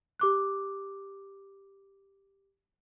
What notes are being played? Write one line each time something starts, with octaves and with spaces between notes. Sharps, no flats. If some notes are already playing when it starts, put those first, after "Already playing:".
G4 D6 F#6